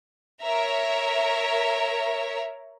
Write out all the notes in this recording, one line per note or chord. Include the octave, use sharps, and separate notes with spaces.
A#4 C#5 E5 A#5